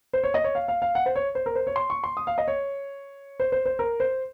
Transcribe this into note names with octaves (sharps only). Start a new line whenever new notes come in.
C5
C#5
D#5
C#5
F5
F5
F5
F#5
C5
C#5
C5
A#4
C5
C#5
C6
C#6
C6
D#6
F5
D#5
C#5
C5
C5
C5
A#4
C5